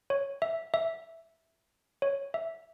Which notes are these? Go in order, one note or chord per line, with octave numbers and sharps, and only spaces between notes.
C#5
E5
E5
C#5
E5